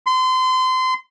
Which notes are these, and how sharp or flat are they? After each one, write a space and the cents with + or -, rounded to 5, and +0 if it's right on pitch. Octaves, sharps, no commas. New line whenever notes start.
C6 -30